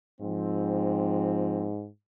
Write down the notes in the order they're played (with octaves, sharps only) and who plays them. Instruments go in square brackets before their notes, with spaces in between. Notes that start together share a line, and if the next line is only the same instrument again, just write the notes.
[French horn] G#2 [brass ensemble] F3 C4